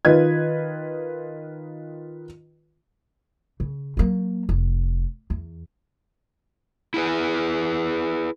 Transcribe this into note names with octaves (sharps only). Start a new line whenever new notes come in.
D#3 F4 B4 D#5 G#6
C#3
F#3 A#3
F1
E2
E4 G#4 B4